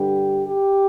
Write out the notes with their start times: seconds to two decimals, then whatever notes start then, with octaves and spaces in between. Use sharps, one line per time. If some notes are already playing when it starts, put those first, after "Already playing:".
Already playing: G2 D3 G3 G4
0.47 G4